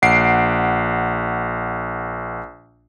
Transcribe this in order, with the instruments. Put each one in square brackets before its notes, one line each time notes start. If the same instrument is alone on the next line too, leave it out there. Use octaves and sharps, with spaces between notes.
[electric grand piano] A#1 F#5 C7 D7